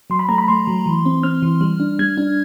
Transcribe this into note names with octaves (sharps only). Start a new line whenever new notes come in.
F#3 C6
B5
A3 A#5
B5
A3 C6
F#3
E3
C4
C4 F6
E3
G3
D4
G3 G#6
D4